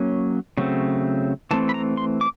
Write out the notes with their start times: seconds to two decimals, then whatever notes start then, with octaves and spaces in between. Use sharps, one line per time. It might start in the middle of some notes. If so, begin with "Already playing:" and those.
Already playing: F#3 A#3 C#4
0.57 C#3 F#3 A3 C4
1.51 E3 A3 C4 A5
1.69 B5
1.74 A#5
1.97 C6
2.21 D6